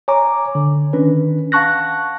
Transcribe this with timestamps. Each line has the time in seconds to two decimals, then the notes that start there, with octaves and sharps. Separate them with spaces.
0.08 C#5 G#5 A#5 D6
0.55 D3
0.93 D#3 C#4 D4 B4
1.52 F5 F#5 A5 C#6 F#6 A#6